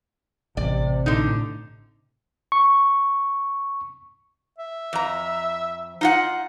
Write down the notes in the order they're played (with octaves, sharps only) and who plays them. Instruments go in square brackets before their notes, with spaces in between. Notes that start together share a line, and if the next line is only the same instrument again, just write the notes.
[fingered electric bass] A1 [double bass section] C3 [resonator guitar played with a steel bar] D5
[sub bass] A2 [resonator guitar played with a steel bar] D3 D#4
[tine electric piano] C#6
[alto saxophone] E5
[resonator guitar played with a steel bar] F2 A#5
D#4 F4 F#5